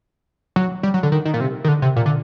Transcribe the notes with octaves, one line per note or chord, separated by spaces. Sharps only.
F#3
G3
F#3
D3
D#3
D#3
A#2
C3
D#3
D3
C3
A#2
D3